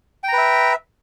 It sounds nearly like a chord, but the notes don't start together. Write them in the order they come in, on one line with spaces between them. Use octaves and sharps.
G5 A#5 B4 E5